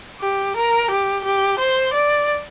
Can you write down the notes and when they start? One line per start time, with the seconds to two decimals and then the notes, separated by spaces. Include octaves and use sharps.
0.21 G4
0.56 A#4
0.91 G4
1.25 G4
1.59 C5
1.94 D5